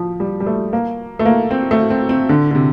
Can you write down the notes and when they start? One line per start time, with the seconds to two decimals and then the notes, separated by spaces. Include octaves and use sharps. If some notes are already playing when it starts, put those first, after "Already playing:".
Already playing: F3
0.20 G3
0.40 G3
0.46 A3
0.73 A#3
1.19 A3
1.25 A#3
1.51 C4
1.71 A3
1.90 C4
2.09 C4
2.29 D3
2.51 D3
2.55 C3